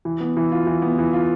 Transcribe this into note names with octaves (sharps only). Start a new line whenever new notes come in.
E3
B3
E3
F4
E3
B3
E3
F4